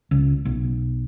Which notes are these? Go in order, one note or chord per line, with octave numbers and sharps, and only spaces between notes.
C#2
B1